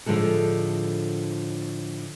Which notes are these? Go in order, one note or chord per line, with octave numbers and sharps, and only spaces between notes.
A2 D3 F3 G#3 A4